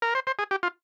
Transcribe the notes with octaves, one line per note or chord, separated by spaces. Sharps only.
A#4
C5
C5
G#4
G4
F4